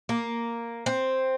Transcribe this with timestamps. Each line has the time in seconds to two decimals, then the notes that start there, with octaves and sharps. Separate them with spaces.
0.09 A#3
0.86 C4